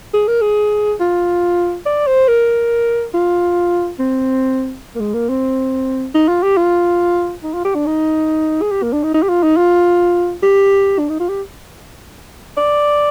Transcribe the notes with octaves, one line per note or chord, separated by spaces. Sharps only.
G#4
A#4
G#4
F4
D5
C5
A#4
F4
C4
A#3
G#3
A#3
C4
D#4
F4
G4
F4
D#4
F4
G4
D4
D#4
G#4
G4
A#3
D4
D#4
D#4
G4
F4
D#4
F4
G4
D4
D#4
F4
G4
D5